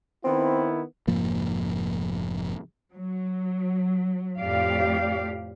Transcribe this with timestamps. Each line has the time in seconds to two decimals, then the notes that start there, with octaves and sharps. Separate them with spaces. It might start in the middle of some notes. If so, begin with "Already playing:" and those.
0.24 D#3 B3 C4 E4
1.07 F1 G#2 F3 A#3
2.92 F#3
4.38 F2 A2 G4 D5 F5